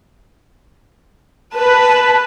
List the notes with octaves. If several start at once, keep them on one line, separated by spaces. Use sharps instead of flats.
B4 A5